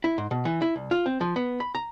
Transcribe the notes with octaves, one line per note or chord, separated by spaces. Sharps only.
E4
G#2
B2
E3
E4
C2
F4
C4
F3
B3
B5
A#5